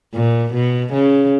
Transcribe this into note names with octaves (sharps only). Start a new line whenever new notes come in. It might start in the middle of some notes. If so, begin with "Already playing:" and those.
A#2
B2
C#3